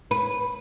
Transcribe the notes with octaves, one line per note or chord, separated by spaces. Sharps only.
B4